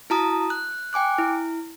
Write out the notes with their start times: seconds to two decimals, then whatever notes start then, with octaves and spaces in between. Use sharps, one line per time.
0.10 E4 F#4 A5 A#5 D#6
0.50 F#6
0.93 G5 G#5 D6 F#6
1.18 E4